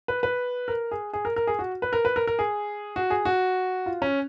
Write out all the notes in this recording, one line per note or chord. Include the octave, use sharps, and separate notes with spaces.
B4
B4
A#4
G#4
G#4
A#4
A#4
G#4
F#4
B4
A#4
B4
A#4
A#4
G#4
F#4
G#4
F#4
F4
C#4